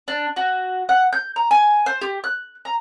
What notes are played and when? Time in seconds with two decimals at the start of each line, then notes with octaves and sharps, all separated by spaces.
0.08 D4
0.36 F#4
0.89 F#5
1.13 G6
1.36 A#5
1.51 G#5
1.86 C5
2.01 G4
2.24 F#6
2.65 A#5